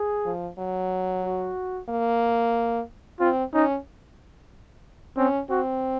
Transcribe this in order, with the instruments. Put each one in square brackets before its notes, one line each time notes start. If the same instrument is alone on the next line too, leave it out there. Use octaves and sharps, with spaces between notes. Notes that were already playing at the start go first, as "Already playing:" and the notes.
Already playing: [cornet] G#4
[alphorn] F3
F#3
[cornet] F#4
[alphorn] A#3
[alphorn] C4 [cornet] F4
[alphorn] C#4 [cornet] D#4
[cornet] C4 [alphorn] C#4
[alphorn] C4 [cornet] F#4